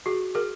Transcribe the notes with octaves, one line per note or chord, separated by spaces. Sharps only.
F#4 G#4
G#4 A#4